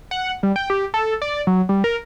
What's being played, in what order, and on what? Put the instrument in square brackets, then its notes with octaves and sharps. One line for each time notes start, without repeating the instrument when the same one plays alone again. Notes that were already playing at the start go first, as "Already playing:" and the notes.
[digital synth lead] F#5
G3
G5
G4
A4
D5
F#3
G3
A#4